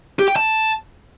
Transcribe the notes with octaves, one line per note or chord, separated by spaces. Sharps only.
G4
G5
A5